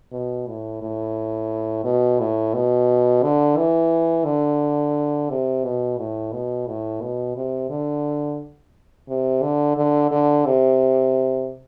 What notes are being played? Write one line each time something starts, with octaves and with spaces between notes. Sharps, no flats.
B2
A2
A2
B2
A2
B2
D3
E3
D3
C3
B2
A2
B2
A2
B2
C3
D3
C3
D3
D3
D3
C3